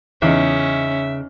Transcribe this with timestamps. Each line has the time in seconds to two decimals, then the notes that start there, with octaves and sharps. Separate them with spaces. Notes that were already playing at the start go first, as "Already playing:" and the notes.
0.22 E2 C#3 C#4 D#4 E5